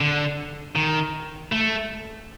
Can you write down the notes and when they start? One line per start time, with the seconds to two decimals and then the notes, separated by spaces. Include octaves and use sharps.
0.01 D3
0.76 D#3
1.52 A3